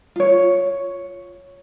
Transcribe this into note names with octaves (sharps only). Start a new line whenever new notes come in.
F4 C#5